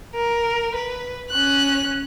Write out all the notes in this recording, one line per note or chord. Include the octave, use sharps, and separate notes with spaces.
A#4
B4
C#4 F#6